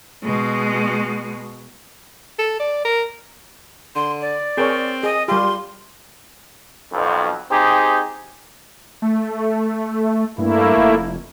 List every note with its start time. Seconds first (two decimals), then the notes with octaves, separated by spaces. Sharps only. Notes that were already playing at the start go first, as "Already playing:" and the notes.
0.23 B2 G#3
2.39 A4
2.59 D5
2.85 A#4
3.95 D3 C6
4.21 D5
4.57 C4 G#4 A#4 C#5
5.03 G#4 D#5
5.28 G3 F4 G4 C6
6.92 B1 F2
7.50 C4 D#4 G4 G#4
9.02 A3
10.38 G2 A3 A#3 E4
10.77 F1